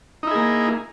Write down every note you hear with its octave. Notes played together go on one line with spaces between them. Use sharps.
A#3 D#4 E4 G#4